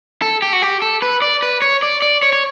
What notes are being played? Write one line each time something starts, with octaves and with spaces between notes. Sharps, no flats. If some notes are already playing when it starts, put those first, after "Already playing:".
A4
G4
F#4
G4
A4
B4
D5
B4
C#5
D5
D5
C#5
C#5